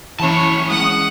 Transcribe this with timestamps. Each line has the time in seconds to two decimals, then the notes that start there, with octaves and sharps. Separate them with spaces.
0.20 E3 C#4 E4 C#5 A5
0.70 G#3 F#5 D#6